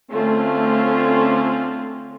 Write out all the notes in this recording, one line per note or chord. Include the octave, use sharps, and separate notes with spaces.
D3 A3 C4 C#4 F4